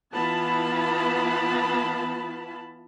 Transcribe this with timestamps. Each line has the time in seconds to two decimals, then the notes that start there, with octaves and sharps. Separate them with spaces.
0.14 E3 B3 E4 F4 A5 B5